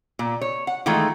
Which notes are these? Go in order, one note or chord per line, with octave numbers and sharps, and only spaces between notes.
A#2
C#5
F#5
D#3 E3 G#3 A3 F4